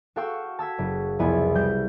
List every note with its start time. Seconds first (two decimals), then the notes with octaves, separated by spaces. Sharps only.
0.16 F#4 A4 F5 G5 C#6 E6
0.59 A5 E6 G#6 B6
0.78 F#1
1.19 C2 F2 B3 E4 G#4 G#5
1.55 G3 G6